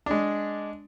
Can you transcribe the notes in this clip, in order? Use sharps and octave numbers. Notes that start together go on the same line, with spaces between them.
G#3 D4